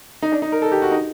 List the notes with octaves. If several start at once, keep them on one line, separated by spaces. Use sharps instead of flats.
D#4
D4
D#4
A#4
A4
G4
F#4
D#4